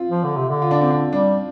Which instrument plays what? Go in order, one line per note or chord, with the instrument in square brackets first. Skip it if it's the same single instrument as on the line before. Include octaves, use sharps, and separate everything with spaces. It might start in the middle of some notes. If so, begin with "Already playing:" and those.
Already playing: [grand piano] C4 F4
[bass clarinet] F3
D3
C3
D3
[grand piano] F4
D4
C4
D4
[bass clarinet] G3 [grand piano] D4